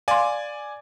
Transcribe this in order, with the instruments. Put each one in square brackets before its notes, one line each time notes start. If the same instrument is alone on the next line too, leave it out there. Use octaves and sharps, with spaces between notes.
[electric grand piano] D5 G#5 [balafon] F5 C6